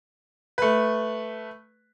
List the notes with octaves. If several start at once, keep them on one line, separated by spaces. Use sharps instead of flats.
A3 B4